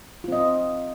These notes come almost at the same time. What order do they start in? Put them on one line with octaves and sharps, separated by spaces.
F4 C4 D#5